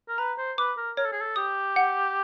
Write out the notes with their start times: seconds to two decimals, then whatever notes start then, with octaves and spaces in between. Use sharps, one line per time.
0.09 A#4
0.18 B4 A#5
0.38 C5
0.58 B4 D6
0.77 A#4
0.97 A#4 C#5
1.05 A4
1.13 G#4
1.21 A4
1.36 G4 D#6
1.76 F#5